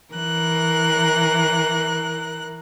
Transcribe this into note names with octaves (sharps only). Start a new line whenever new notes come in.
E3 A#4 F#6